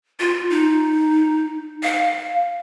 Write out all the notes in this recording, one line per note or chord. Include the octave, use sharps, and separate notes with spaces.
F4
D#4
F5